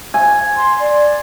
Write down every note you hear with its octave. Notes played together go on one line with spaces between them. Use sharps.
G#5
C6
D5